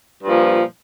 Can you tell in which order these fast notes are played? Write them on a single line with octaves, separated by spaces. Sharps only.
G2 A#2 F3